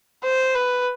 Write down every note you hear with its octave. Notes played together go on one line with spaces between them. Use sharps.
C5
B4